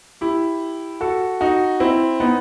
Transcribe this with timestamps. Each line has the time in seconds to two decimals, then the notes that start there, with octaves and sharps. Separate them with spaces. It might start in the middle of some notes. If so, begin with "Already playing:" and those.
0.21 E4 G4
1.01 F#4 A4
1.41 D#4 F#4
1.80 C4 E4
2.20 B3 D#4